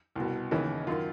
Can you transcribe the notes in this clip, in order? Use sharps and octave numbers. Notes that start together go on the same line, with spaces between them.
C2 B2
D#2 C#3 E3
F#2 D#3 F4